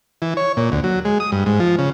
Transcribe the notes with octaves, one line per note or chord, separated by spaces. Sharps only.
E3
C#5
A#2
D2
F#3
G#3
D#6
G2
G#2
F3
C#3